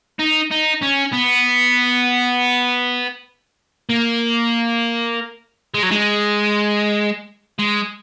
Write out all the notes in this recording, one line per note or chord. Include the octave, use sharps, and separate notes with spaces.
D#4
D#4
C#4
B3
A#3
G#3
F#3
G#3
G#3